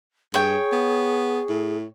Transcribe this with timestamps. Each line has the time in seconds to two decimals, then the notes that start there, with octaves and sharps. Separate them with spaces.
0.34 G2 G#4 C#5 G5
0.72 B3
1.49 A2